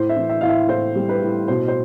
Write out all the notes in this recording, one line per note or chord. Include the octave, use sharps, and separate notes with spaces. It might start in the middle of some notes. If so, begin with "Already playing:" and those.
Already playing: A2 C5
E5
E3
E5
A2 F5
E5
A2 C5
G3
B4
A2
B2 C5
C5